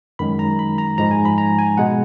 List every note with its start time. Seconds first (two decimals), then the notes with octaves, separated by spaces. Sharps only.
0.19 F#2 D#3 G#3 B5
0.39 A#5
0.59 B5
0.78 A#5
0.98 G#2 F3 G#3 A#5
1.11 G#5
1.25 B5
1.38 A#5
1.58 G#5
1.78 B2 G#3 F#5